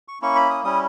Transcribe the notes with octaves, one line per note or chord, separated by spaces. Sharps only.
C#6
A#3 C#4 E4 C#6
B5
D#6
G3 C#4 E4 D#6